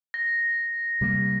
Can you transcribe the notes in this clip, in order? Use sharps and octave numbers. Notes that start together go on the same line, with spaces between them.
A#6
C3 G3 A#3